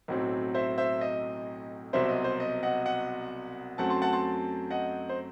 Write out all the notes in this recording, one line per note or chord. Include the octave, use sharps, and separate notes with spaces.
B1 A2 F#3 C4
C5 E5
C5 E5
D#5
C2 B2 F#3 C4 C5 E5
D#5
C5
D#5
D#5 F#5
D#5 F#5
F#2 F#3 A3 C4 F#5 A5
A5 C6
F#5 A5
A5 C6
D#5 F#5
C5